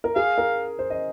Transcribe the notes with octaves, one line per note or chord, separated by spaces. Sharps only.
A#4
G#4 F5
A#4
C5
D#5